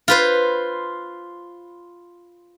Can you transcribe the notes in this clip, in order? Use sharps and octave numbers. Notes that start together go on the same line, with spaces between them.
F4 B4 C5